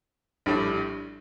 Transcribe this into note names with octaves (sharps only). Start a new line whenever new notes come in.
A#1 A2 G3 D4